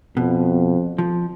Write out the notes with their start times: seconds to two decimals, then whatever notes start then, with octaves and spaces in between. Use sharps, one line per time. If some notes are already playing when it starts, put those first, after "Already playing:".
0.17 F2 B2
0.98 F3